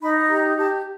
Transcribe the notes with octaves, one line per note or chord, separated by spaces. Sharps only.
D#4 B5
G4 A#5
G4 A5